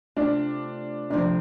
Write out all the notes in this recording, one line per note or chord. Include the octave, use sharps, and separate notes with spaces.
C3 A3 D4 F4
D2 C3 F3 D4